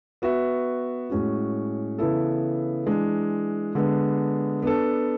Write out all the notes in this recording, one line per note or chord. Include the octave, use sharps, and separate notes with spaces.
B3 F#4 B4 E5
A2 G#3 C#4 F#4
C#3 E3 B3 E4 A4
E3 G#3 D4
D3 G#3 B3
B3 D4 A4